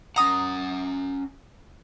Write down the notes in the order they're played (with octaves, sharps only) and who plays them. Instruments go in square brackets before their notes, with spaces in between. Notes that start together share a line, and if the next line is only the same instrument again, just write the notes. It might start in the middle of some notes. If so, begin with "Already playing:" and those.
[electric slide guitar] C#4 F#5 [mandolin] A#5 D#6